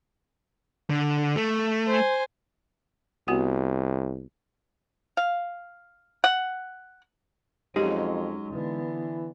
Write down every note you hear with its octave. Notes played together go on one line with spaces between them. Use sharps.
D3
A3
C5 G#5
C2 B3 F#4 F#5
F5
F#5
F2 F#3 G#3 C#4 D#4 G4
D3 E3 B3